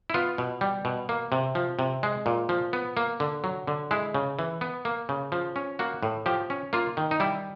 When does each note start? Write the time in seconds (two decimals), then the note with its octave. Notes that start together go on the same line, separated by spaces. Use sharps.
0.10 E4
0.14 B3 F4
0.38 B2
0.61 G3
0.85 B2
1.09 A#3
1.32 C3
1.55 F3
1.79 C3
2.03 G#3
2.26 A#2
2.49 F3
2.73 B3
2.97 A#3
3.20 D3
3.44 F#3
3.67 D3
3.91 G#3 E4
4.14 C#3
4.39 E3
4.61 B3
4.85 A#3
5.09 C#3
5.32 F3
5.56 C#4
5.79 A#3 F#4
6.03 A2
6.26 F3 G4
6.50 C#4
6.73 A#3 F4
6.97 D#3
7.11 D#4
7.20 G3 E4